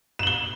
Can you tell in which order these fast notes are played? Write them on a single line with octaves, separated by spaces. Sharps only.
E7 F#7 G7